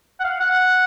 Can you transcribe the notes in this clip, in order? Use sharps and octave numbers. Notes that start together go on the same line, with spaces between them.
F#5
F5
F#5